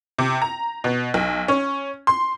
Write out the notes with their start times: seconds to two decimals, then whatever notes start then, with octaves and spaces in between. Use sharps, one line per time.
0.19 C3
0.42 A#5
0.84 B2
1.14 B1
1.48 C#4
2.07 C6